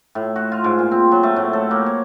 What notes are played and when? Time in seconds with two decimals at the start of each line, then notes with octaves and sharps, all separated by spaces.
0.15 A2
0.36 F#4
0.52 F4
0.64 G#2
0.79 A#2
0.91 C4
1.12 F#3
1.23 A3
1.36 A2
1.53 A4
1.71 A#3
1.86 C#5